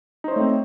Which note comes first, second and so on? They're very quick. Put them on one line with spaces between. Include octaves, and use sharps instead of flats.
D#4 C5 C#5 A3 C4